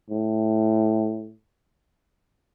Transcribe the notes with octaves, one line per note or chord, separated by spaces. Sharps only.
A2